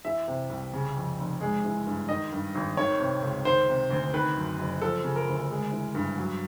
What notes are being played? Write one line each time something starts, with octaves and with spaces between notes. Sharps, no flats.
E3 E5
C3
C2
C#3
F2
F1
G#3
E3
G2
D#3 D#5
G2
G#1
D#3 C#5
C3
C#2
D#3 C5
C3
D2
D#3 B4
F#2
F#1
F3 A4
C#3
A#4
D2
G#3
E3
G2
F#3